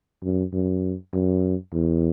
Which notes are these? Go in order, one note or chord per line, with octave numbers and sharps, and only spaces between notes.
F#2
F#2
F#2
E2